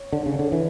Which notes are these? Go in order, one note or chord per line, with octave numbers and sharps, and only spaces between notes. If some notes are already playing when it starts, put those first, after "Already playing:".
Already playing: C#5
D3
C#3
D3
E3